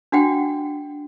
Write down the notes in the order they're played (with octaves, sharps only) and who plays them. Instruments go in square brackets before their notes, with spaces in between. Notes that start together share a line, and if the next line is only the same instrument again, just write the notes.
[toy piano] D4 F#4 F#5 G5